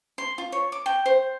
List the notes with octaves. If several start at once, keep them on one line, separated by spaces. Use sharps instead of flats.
C6
F4
C#5
D6
G5
C5